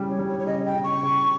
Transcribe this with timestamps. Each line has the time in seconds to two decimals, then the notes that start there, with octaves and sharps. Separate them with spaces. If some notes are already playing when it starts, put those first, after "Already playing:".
Already playing: C#3 G3
0.10 C#5
0.19 G3
0.29 C#5
0.39 C#5
0.47 C#3 D#5
0.66 G5
0.75 C#3
0.84 C#6
1.03 C#3